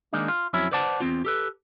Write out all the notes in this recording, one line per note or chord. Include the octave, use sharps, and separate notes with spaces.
D#3 G#3 A#3 D4 D#4
F4
F2 F#3 C#4 E4
B4 C5 D5 F#5 A5
E2 C4 F4
G4 A4 B4